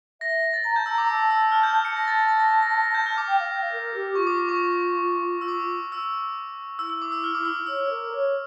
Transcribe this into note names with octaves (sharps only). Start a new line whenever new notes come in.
E5 A#6
A#6
A6
A#5 A6
A5 G6
A#5 E6
A#5 D6
A5 E6
E6
F6
G6
G6
C#7
A5 A#6
A6
A6
A#6
A#6
A#6
G6
F6
D6
G5
F5
G5
F5
A#4
G4
F4 C#6
D6
D6
C#6
E6
D6
E6
E4 E6
E6
D6
E6
F6
D6
E6
C#5 E6
A#4
C#5